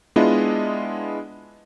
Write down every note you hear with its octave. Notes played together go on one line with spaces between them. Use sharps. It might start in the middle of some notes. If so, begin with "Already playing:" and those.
G#3 B3 D4 E4 F4 D#5